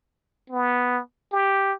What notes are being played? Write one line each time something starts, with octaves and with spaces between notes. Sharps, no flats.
B3
G4